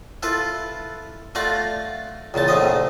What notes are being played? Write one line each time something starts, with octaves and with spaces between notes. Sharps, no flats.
E4 F4 A4 B4
A3 F4 D5 F5 F#5 A#5
C#2 A#2 E3 A5
A#1 G#2 A3 C4 D#5 D#6